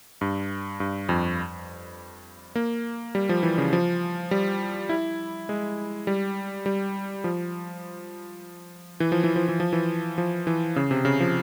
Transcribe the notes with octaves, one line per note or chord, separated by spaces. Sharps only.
G2
G2
F2
A#3
G3
F3
E3
C#3
F3
G3
E4
G#3
G3
G3
F3
E3
F3
E3
F3
E3
F3
E3
F3
E3
C#3
C3
C#3
F3